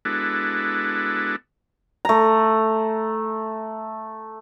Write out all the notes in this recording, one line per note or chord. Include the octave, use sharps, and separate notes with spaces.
G#3 B3 D4 E4 F#4 A4
A3 A#5